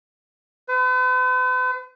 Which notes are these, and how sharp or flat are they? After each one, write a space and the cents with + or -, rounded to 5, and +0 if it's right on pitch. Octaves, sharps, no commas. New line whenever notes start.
B4 +45